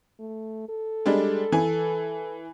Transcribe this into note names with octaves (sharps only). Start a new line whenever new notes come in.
A3
A4
G3 G#3 D4
E3 G#5